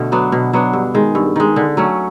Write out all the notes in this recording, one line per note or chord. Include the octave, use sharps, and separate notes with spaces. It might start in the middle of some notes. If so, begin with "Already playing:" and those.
Already playing: B2 D3 A3
F#3 B3 D4
B2
F#3 B3 D4
G2
D#3 G#3
G2
D#3 G#3
D3
F#3 A3 C#4